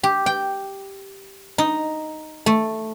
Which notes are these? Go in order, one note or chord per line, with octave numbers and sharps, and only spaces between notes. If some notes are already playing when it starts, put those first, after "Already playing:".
G4
G5
D#4
A3